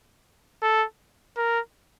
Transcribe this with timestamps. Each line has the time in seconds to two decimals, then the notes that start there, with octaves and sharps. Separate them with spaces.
0.62 A4
1.37 A#4